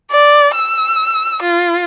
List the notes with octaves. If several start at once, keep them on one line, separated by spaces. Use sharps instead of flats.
D5
E6
F4